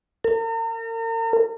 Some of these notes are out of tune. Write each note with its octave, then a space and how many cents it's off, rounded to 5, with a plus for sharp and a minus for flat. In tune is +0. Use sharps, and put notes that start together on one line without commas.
A#4 -40